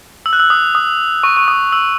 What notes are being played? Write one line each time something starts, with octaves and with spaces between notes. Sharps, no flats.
E6
F#6
E6
D#6
D#6
C#6
C#6
D#6
E6